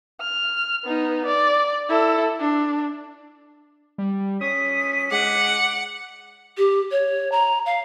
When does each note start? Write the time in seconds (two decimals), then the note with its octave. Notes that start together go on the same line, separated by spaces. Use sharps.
0.21 F6
0.84 B3 D#4
1.25 D5
1.89 E4 A4
2.40 D4
3.98 G3
4.41 C#4 D#6 B6
5.11 G#3 F#5 D6
6.58 G4
6.91 C#5
7.32 A#5
7.66 F5